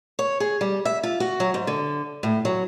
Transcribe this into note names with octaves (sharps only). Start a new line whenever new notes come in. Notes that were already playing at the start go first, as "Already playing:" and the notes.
C#5
G#4
G3
E5
F4
F#4
F#3
G#2
D3
A2
F#3